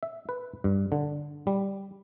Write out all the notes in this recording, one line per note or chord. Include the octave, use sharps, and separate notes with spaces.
E5
B4
G2
D3
G3